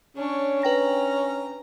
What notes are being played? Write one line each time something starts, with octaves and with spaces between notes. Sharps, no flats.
C#4 D4 C#5
B4 G5 A#5 A#6